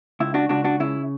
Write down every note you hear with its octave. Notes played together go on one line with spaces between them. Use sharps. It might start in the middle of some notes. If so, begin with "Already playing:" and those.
C#2 E4
D4 F#4
C#2 D4 F#4
D4 F#4
C#3 E4